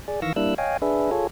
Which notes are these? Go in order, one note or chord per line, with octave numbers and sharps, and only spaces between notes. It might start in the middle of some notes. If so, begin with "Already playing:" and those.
G#4 D5
D#3 E3 F5 C#6 E6 A#6
G3 A#3 D4 E4 E6 F#6
C#5 D#5 F5 G5 G#5
D4 G#4 B4 E5
F4 G#4 A4 C#5